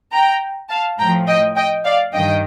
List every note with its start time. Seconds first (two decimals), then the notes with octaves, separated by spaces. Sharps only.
0.13 G5 A#5
0.69 F5 A5
0.99 A2 F3 G5 A#5
1.27 D#5 G5
1.56 D#5 G5
1.85 D5 F5
2.13 G2 D#3 D#5 G5